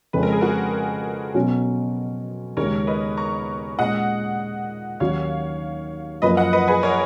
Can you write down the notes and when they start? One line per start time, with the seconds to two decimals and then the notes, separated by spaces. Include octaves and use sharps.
0.13 F2 C#3 G#3 C#4 B4
0.23 A#4
0.32 G#4
0.41 F#4 A#4
1.35 B2 F#3 C#4
2.57 D#2 C#3 G#3 C#4 A#4 C#5
2.87 B4 D#5
3.17 A#5 C#6
3.79 A#2 G#3 C#4 D#5 F#5
5.00 D#2 D#3 F#3 C#4 F#4 C#5 F5
6.22 F#2 F3 A#3 B4 D#5
6.37 D#5 F#5
6.53 B4 D#5
6.68 G#4 B4
6.83 A#4 C#5